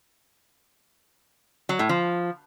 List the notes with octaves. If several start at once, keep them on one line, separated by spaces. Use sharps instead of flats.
F#3
A2
F3